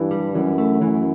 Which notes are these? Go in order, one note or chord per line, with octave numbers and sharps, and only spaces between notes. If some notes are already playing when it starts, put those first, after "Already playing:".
Already playing: G2 E3
G3
F#2 E3
A3
F#2 E3